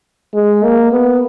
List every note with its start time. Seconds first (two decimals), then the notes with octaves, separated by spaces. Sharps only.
0.34 G#3
0.64 A#3
0.92 B3